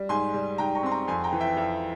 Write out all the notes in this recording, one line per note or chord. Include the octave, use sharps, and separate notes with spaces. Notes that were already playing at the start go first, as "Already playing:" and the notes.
Already playing: G3
G#2 G#5 C6
G3
G#2 G5 A#5
A#5 C#6
C4 C6
A#5 C#6
F2 G#5 C6
G5 A#5
E3
E5 G5
F2 E5